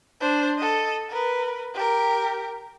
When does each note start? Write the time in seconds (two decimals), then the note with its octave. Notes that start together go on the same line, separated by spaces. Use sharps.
0.21 D4 C5
0.58 A4 D#5
1.09 A#4 B4
1.74 G4 A#4